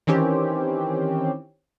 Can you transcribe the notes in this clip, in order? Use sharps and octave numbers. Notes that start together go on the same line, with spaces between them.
D#3 E3 C4 C#4 G4